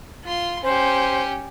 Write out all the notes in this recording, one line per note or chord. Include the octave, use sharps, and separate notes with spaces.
F4 C6
C#4 G4 C5